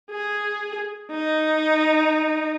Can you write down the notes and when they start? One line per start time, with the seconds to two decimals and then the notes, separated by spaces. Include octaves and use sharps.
0.11 G#4
1.11 D#4